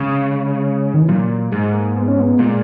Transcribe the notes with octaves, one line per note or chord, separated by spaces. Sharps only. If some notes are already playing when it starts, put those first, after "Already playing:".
Already playing: C#3 G#3
D#3
E3
A#2 F#3
G#2 G#3
A#3
B3
C#4
B3
A#2 G#3